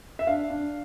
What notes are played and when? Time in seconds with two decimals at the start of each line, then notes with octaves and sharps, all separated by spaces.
0.19 E5
0.27 D4 F5
0.50 D4